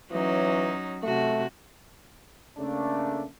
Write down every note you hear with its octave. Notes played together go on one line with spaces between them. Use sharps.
E3 F#3 C#4 D#4
C3 A3 F#4
C#3 A3 A#3 D4